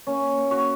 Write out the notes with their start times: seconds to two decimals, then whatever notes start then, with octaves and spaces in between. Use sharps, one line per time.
0.07 A#3 C#4
0.37 A#3
0.51 F#4